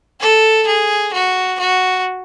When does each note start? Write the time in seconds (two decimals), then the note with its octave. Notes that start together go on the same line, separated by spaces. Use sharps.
0.20 A4
0.67 G#4
1.13 F#4
1.59 F#4